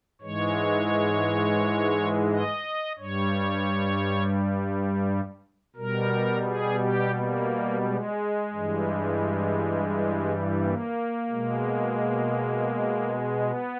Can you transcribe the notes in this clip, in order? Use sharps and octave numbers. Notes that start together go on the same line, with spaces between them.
G#2 E3 G#3 C#5
D#5
G2 G3 C#5
B2 G3 A#4
G#4
G4
A#3
G#3
G2 E3 G3
A#3
B2 G#3
B3